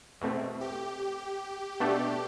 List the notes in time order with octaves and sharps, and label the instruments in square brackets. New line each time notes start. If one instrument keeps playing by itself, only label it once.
[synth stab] E2 B2 A3 C4
[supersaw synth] G4
[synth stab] B2 A3 D4 G4